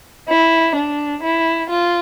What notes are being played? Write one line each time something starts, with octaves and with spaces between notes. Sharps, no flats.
E4
D4
E4
F4